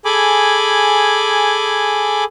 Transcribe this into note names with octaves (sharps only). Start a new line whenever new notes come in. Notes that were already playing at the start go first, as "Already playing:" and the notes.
G#4 A4 G#5 B5 D6